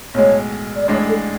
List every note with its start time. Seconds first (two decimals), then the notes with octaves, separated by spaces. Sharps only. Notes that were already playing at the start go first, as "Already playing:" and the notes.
0.14 B1 A2 G#3 C#5
0.75 D5
0.88 A1 A2 G#3 D4 C#5
1.08 A4